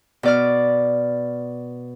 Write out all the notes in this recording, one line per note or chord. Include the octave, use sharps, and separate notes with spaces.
B2 D5 F6